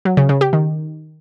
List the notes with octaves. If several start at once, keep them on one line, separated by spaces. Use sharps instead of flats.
F#3
C#3
C#3
G4
D#3